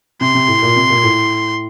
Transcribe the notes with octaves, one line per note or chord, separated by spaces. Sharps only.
C3 C6
C3
A2
A#2
C3
A#2
A2